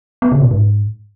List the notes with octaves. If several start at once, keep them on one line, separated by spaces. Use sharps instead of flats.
B3
C#3
B2
G#2